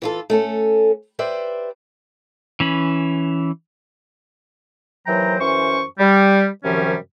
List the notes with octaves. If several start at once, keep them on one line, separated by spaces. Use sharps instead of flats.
E3 F4 A4
A3 C#4 A4
G4 B4 C5 D5 E5
E3 C#4 B5
D#2 E3 F#3 C5 G5 A#5
F#2 E3 C#4 C5 C#6
G3
F#2 C3 D#3 F3 G3 C#4